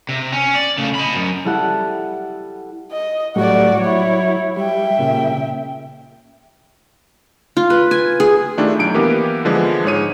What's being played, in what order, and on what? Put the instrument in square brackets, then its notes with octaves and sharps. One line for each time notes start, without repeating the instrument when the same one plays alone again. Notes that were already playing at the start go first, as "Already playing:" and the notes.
[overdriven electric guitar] C3
C#4
D5
C#3 A3
D#5 B5
F#2
[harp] G3 E4 A4 F#5
[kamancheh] D#5
[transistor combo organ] A2 F#3 G3 [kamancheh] F#4 D5
[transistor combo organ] F#3 [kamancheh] E4 C#5
[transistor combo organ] G3 [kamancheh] E5 G5
[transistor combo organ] A#2 C#3
[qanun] F4
B4
G#5
G#4
[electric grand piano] D#3 A3 D4 E4 F4 G4
B1 D7
E3 A#3 B3 G4 A#4 B4
D3 E3 F3 G#3
G#2 G#4 C#5 D#7